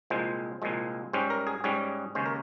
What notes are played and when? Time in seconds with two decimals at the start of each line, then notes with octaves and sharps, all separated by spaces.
0.10 C2 A#2 F3 G#3 C5
0.62 C2 A#2 F3 G#3
1.13 G#2 G3 C#4 C5
1.30 A#4
1.47 G#4
1.64 G#2 G3 C#4 G#4
2.15 D#2 C#3 G#3 C#4 C5
2.26 A#4